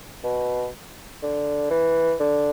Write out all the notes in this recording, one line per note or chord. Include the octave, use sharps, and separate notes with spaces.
B2
D3
E3
D3